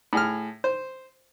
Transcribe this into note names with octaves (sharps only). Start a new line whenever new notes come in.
A2 G#4 F6
C5